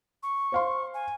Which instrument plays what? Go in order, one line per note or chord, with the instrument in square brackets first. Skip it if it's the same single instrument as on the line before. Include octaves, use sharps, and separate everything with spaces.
[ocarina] C#6
[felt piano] C5 F5 C6
[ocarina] G#5